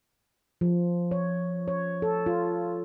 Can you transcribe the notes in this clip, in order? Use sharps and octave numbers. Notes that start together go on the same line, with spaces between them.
F3
C#5
C#5
A4
F4